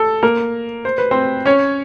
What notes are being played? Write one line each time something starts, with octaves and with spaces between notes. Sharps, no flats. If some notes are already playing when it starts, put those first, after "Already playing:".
Already playing: A4
A#3 A#4
C5
B4
C4 C5
C#4 C#5